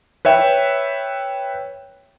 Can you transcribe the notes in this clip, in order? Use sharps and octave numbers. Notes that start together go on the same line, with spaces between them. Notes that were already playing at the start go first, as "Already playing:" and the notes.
B4 C#5 E5 G5